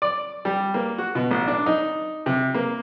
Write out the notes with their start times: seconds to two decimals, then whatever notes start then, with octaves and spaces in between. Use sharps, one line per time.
0.02 D5
0.45 G3
0.74 A#3
0.98 F#4
1.15 B2
1.31 A1
1.48 D4
1.66 D#4
2.26 C3
2.55 A#3